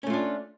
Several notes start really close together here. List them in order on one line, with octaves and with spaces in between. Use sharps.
C#4 A3 F4 D4